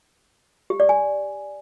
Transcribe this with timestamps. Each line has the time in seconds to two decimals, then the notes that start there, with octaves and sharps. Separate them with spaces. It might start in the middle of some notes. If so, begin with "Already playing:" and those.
0.70 G4
0.80 D5
0.89 G#5